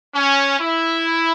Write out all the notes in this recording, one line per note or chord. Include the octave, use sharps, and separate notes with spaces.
C#4
E4